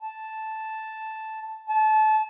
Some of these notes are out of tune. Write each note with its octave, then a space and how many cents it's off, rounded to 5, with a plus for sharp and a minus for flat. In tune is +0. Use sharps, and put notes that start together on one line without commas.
A5 -5
A5 -25